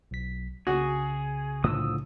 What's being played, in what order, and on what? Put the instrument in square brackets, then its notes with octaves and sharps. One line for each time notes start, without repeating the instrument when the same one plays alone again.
[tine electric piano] B1 B6
[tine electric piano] C2 C#3 [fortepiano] F#4 [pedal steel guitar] G#4
[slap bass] A2 D3 F3 [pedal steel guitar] D#6 E6